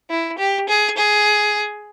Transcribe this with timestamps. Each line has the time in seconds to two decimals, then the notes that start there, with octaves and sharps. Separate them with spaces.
0.10 E4
0.38 G4
0.69 G#4
0.97 G#4